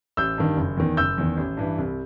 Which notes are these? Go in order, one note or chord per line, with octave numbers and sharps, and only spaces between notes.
A1 E6 G6
G2 D#3
F#1
E2 D#3
F#1 E6 G6
E2 D#3
A1
G2 E3
C2